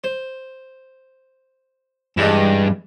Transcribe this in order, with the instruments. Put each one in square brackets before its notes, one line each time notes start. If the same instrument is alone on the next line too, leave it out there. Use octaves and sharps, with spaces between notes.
[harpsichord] C5
[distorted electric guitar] G2 [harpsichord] E3 G3 G#3